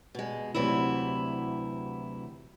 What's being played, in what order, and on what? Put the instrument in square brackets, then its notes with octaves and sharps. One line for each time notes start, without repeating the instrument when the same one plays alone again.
[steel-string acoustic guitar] B2 G#3
D2 C3 E3 F#3 E4